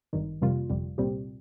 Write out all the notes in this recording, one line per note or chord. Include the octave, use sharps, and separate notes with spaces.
G#1 G2 D#3
F2 C3 G3 A#3 F4
G1 F2 C3 G3
C2 A#2 G3 C4 G4